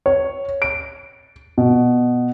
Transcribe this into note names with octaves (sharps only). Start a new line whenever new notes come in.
C#5
D7
B2